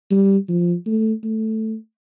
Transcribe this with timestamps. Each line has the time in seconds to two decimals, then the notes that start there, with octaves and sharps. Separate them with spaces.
0.11 G3
0.49 F3
0.86 A3
1.23 A3